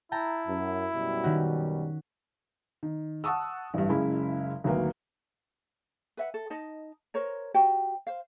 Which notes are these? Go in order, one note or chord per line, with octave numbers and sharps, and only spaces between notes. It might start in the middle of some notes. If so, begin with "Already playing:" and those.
E4 G5 A5 A#5
F#2
F#2 B2 G3
D#3 C#4 F#4
D#3
F#5 A5 C#6 D#6 E6
A1 G2
F#1 C#3 G#3 C#4 E4
G#1 D2 F#3 A#3 B4
B4 E5 F#5
A4
D#4 D#5 A5
A#4 C5 C#5 A#5
F#4 G4 C5 G5
C5 F5